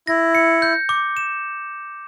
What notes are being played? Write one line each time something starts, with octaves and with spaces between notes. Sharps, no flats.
E4 A#6
C#7
G6
D6
E7